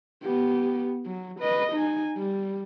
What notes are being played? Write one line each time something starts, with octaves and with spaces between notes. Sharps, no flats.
B3 G4
F#3
B4 D#5
D#4 G#5
G3